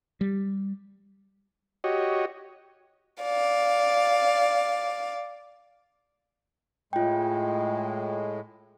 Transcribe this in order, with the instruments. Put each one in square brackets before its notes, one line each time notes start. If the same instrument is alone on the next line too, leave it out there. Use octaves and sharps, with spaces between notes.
[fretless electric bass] G3
[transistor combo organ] F#4 G4 C#5 D#5
[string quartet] D5 F5
[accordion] A2 G#3 [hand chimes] F4 G5